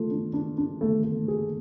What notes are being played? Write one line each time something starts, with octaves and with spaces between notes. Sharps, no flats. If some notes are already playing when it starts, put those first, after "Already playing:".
Already playing: A3 F4
D4
D4
D4
A3
A3
G#4